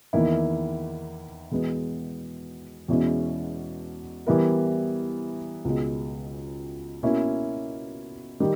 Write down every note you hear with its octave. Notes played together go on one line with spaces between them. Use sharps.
E2 D#3 A#3 E4
E2 B2 G#3 B3
E2 B2 G#3 C#4 E4
E3 G3 B3 E4 A#4
C#2 B2 G#3
B2 A#3 C#4 E4
D#3 G3